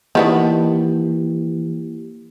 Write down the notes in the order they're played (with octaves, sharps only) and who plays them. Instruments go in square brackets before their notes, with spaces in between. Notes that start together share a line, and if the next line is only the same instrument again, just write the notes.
[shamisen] D#3 B3 D4 [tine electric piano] E3 [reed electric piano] A#3 E4 G4